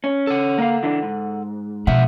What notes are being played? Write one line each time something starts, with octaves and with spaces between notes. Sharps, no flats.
C#4
A4 F#5
A#3 F5
E3 D4 E4
G#2
B2 F3 E5 F#5